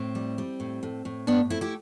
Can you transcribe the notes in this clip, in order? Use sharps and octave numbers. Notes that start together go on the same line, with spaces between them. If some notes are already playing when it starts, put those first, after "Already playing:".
Already playing: A2 C4
G3
G3
A2
A2
A2
G2 B3 D4
A3 C4 E4
E4 G4